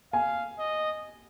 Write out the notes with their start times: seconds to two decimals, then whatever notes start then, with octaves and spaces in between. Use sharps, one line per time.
0.13 F5 G#5
0.59 D#5